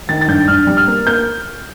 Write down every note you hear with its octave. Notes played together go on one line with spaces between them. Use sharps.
D#3 A6
A6
G2 G6
G2 F6
G3
F6
A#3
A#3 G6